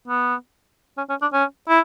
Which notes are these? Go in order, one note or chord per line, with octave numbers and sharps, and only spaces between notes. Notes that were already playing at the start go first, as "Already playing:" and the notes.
B3
C#4
C#4
D4
C#4
E4